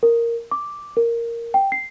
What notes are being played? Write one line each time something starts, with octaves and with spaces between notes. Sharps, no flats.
A#4
D6
A#4
G5
C7